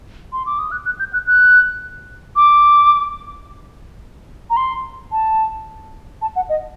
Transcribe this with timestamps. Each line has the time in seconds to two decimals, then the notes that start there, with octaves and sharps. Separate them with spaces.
0.33 C6
0.46 D6
0.59 D#6
0.72 F#6
0.86 F#6
0.99 G6
1.13 F#6
1.27 F#6
2.36 D6
4.50 A#5
4.57 C6
5.12 A5
6.22 A5
6.36 F#5
6.49 D#5